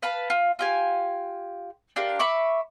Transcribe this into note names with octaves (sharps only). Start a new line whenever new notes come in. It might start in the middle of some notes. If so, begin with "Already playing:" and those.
B4 F5 A5 B5
F4
F4 G4 G#5
D4 F4 G4 A#4
E5 B5 C#6 D6